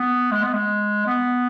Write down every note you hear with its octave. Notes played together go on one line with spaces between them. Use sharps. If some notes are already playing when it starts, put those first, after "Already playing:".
Already playing: B3
G#3
B3
G#3
B3